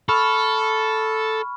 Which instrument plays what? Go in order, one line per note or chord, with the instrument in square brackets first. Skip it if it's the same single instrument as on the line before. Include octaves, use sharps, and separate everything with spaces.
[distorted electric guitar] A4 [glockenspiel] B5 C#6 F6